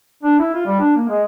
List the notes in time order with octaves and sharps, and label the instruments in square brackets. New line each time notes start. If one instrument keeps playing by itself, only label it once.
[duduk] D4
E4
F4
G3
D4
A#3
G#3